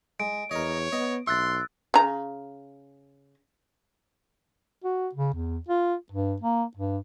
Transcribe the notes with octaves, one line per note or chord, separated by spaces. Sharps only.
G#3 D7
E2 A#4 C#5 D#5
B3 D#5
B1 E5 C6 E6 F#6 A6
C#3 A#5
F#4
C#3
E2
F4
G2
A#3
G2